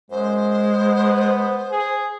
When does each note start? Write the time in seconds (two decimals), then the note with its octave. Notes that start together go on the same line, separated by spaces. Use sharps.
0.11 F#2 G#3 C5
0.75 B3
1.71 G#4